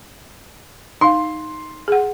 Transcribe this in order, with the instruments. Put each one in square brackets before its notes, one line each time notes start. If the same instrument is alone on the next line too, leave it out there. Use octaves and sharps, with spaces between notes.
[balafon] D#4 F5 [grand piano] C6
[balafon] G#4 F#5